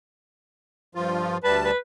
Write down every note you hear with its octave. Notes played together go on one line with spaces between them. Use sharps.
G2 F3 F4
D2 G3 B4 A5
B4